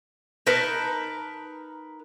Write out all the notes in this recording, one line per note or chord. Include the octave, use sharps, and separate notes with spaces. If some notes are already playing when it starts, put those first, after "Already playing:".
D#4 A#4 B4 A5